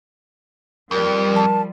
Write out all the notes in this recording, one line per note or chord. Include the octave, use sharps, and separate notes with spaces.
F2 F3 G3 A#4
A5